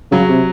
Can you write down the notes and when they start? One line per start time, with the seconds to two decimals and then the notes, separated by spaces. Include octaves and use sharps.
0.11 C#3 F#3
0.29 C3